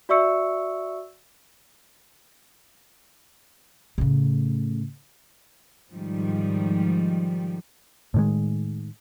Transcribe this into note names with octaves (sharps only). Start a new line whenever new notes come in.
F#4 D5 E5 C#6 E6 C#7
A2 C#3
G#2 D#3 F3 G3
A2 D#3 G#3